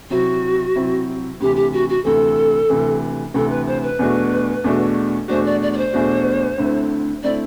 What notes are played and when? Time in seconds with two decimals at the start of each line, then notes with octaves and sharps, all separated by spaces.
0.10 C3 F#3 C4 E4 F#4
0.76 C3 F#3 C4 E4
1.40 D2 C3 E3 G4
1.56 G4
1.73 F#4
1.89 F#4
2.04 D2 C3 E3 A4
2.69 D2 C3 E3
3.34 D2 C3 E3 A4
3.50 B4
3.66 C5
3.83 B4
3.99 E2 B2 A3 D4 F#4
4.64 E2 B2 A3 D4 F#4
5.28 E2 B2 A3 D4 F#4 C5
5.45 D5
5.62 D5
5.72 D5
5.77 C5
5.93 E2 B2 A3 D4 F#4
6.58 D2 D3 A3 C4 E4
7.23 D3 A3 C4 E4 D5